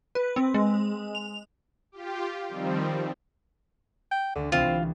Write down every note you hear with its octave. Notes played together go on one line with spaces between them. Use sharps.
B4
C4
G#3
F7
F4 G4
D#3 F3 G3 C4
G5
D2 D3
C2 E3 C4 F4